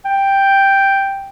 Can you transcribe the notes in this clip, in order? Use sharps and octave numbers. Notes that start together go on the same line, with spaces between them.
G5